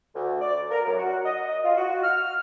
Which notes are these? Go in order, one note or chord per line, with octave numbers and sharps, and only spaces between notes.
D2
D5
A#4
F#2
F#4
D#5
D#5
F4
F#4
F6